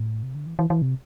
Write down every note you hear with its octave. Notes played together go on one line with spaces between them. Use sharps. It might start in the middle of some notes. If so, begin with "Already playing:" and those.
Already playing: A2
C3
D3
E3
E3
E3
C3